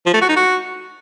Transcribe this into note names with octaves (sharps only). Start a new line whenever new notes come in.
F3
A3
F#4
D#4
F#4